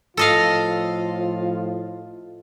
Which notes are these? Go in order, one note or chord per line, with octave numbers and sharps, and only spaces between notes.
A2 F3 F4 A4 D#5 F5